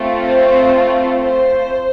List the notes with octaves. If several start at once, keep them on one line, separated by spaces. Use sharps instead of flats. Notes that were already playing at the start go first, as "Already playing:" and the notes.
Already playing: A3 C4 F4
C5
C5